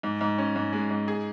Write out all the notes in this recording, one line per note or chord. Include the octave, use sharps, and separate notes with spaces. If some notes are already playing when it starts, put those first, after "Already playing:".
G#2
G#2
C#4
G#2
G#3
G#2
G#4